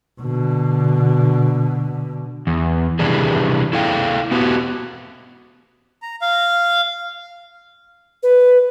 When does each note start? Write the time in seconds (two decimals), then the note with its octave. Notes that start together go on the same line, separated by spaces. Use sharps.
0.21 B2 D3
2.47 E2
2.99 C3 E3 G3 D4 G#4
3.73 E4 A4 F5 G5
4.31 B3 F#4 G4
6.02 A#5
6.21 F5
8.23 B4